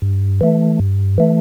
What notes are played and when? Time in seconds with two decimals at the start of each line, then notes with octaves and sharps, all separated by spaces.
0.02 G2
0.41 E3 A3
0.79 G2
1.18 E3 A3